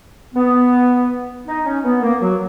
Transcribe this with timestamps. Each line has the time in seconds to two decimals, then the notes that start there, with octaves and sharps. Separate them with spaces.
0.34 B3
1.47 D#4
1.66 C#4
1.85 B3
2.02 A#3
2.22 F#3